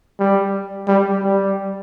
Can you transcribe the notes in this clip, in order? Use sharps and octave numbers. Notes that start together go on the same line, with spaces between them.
G3
G3
G3